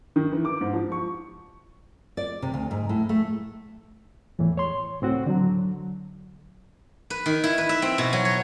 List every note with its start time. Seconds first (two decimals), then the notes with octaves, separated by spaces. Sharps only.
0.16 D#3
0.32 E3
0.45 D6
0.61 G#2
0.74 F3
0.92 C#6
2.17 D5
2.42 C3
2.54 D2
2.71 G#2
2.89 A2
3.09 A3
4.39 E2 A2 E3
4.57 C#5 C6
5.01 C#2 A2 C4 F#4
5.27 D3 F#3
7.10 B4
7.26 D#3
7.44 E4
7.58 B4
7.69 E5
7.82 C4
7.98 B2
8.13 F#3
8.25 C#5